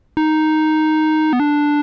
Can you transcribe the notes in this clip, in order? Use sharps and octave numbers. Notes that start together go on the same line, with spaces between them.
D#4
B3
D4